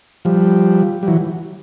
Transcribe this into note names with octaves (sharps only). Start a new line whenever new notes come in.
F3 G3
G3
E3 F#3